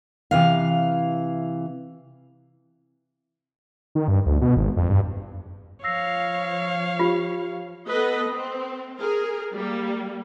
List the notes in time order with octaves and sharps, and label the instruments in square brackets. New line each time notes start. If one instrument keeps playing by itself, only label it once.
[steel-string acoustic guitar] C3 E3 F5
[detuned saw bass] D#3
G2
D2
B2
G#1
F2
G2
[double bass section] F3 [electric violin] C#5 F5 [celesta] E6 A#6 C7
[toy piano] F4 [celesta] G4
[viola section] B3 A4 B4 D#5
C4
G#4 A#4
G3 A#3